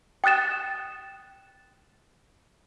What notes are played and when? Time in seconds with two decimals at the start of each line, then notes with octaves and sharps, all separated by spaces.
0.24 G5 D#6 F#6 A6 E7